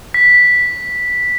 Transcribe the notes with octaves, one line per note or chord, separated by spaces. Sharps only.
B6